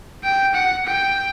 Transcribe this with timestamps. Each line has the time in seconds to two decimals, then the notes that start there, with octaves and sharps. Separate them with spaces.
0.24 G5
0.54 F#5
0.85 G5